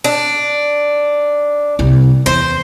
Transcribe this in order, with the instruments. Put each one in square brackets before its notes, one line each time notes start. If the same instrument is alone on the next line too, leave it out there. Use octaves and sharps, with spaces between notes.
[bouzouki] D4
[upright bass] C2
[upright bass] E2 [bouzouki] C5